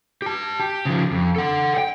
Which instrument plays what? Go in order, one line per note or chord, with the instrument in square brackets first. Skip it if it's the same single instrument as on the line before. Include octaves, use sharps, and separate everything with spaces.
[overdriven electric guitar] G4 A5
G4
C#3 F3
F2
A4 F#5
F#5 G5